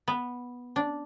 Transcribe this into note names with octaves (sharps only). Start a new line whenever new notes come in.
B3
D4